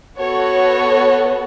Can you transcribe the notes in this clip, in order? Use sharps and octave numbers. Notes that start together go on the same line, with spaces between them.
B3 F#4 A4 C#5